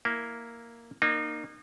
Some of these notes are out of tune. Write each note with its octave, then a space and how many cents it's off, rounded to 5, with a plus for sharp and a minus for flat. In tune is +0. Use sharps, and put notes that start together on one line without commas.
A#3 +0 E4 +0
A#3 +0 D#4 -35